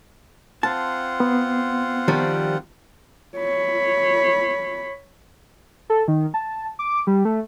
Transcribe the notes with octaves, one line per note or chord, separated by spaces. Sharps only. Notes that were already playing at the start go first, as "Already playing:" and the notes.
C4 F4 F#5 A5
B3
D#3 F3 G3
C#5 B5
A4
D#3
A5
D6
G3
A3